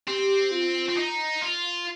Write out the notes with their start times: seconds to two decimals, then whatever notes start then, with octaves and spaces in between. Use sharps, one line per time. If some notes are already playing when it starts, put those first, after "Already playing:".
0.07 C4 G4
0.51 F4
0.89 C4
0.97 D#4
1.41 F4